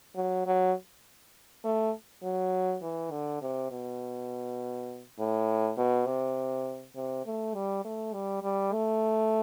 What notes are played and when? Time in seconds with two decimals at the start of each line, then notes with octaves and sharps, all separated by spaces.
0.15 F#3
0.46 F#3
1.64 A3
2.23 F#3
2.82 E3
3.11 D3
3.41 C3
3.71 B2
5.19 A2
5.77 B2
6.06 C3
6.96 C3
7.26 A3
7.54 G3
7.85 A3
8.14 G3
8.43 G3
8.72 A3